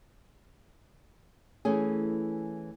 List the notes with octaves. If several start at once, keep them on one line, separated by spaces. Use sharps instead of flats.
E3 A3 C#4 G#4